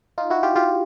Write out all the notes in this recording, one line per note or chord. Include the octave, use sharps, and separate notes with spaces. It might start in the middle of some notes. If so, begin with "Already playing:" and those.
D#4 F4
E4 F#4
F4 G4
F4 G4